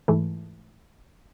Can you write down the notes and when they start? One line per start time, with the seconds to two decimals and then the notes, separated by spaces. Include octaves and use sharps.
0.08 G#2 E3 A3